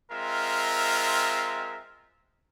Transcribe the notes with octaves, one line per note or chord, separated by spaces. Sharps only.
G#3 C4 F4 A#4 E5